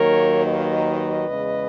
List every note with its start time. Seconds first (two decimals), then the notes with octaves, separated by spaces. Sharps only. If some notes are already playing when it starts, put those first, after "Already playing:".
Already playing: D#2 D#3 F#3 A#3 A#4 C#5
0.44 B4 D#5
1.27 E2 C#3 G#3